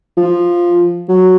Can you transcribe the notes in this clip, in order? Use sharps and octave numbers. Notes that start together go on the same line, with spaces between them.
F3
F#3